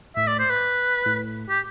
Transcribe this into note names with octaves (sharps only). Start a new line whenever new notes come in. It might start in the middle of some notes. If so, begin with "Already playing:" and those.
A2 E5
D5
C5
B4
A2
G4